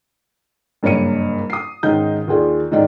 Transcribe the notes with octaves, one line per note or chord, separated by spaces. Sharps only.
F#1 G2 A#3 C#5 C#7 D#7
D#6 C7
G#2 D#3 C#4 D#4 G6
D#2 F4 G#4 D5
G#2 D#3 D#4 D5